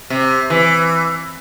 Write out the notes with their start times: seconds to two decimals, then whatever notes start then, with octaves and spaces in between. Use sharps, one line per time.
0.10 C3
0.50 E3